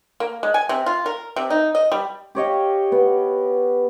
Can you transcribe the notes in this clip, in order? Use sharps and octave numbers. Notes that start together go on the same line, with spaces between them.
A#3
G#3
G#5
C3
F4
A#4
C3
D#4
D#5
G3
G4 C#5 D#5 F5
B3